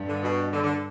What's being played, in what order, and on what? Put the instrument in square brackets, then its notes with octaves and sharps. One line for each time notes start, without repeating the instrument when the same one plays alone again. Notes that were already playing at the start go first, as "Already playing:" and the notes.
Already playing: [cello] G2
[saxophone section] D3
B2
D3
D3